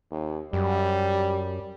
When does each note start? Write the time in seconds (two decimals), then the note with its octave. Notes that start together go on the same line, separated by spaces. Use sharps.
0.11 D#2
0.53 F#2 G3